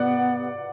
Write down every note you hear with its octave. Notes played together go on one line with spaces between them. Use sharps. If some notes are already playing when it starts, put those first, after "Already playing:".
Already playing: B3 D5 F#5